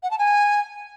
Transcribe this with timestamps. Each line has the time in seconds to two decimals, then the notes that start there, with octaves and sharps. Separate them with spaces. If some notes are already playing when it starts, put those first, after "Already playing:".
0.03 F#5
0.11 A5
0.19 G#5